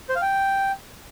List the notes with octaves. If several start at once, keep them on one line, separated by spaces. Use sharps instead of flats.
C5
F5
G5